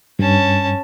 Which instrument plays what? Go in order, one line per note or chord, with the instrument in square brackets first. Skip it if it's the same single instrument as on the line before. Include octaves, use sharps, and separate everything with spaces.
[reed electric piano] G2 [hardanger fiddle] C#4 A5